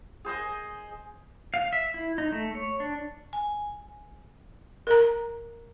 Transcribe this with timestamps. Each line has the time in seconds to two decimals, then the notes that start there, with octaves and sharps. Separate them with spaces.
0.25 G#4 C5 D#5 G#5
1.54 F5
1.73 E5
1.94 E4
2.18 D#4
2.32 A3
2.55 C#5
2.80 D4
3.33 G#5
4.87 A#4 A#5